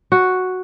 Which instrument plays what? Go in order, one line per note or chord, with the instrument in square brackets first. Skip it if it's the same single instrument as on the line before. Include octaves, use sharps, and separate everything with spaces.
[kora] F#4